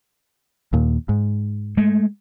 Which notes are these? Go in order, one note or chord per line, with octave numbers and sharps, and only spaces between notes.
D#2 A#2
G#2
G#3 A3